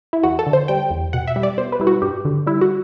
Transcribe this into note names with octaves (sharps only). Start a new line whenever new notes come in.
E4
E2 F#4
A4
D3
C5
G3 G5
E2
B2 F#5
E5
G3
D5
B2 C5
B4
G3 E4
F#4
G2 G4
D3
G3 E4
F#4